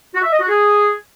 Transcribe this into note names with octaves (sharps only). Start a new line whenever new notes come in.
F#4
E5
D#5
F#4
G#4